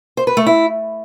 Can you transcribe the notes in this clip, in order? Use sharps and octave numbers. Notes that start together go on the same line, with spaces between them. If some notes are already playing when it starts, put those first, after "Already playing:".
C5
B4
A3
E4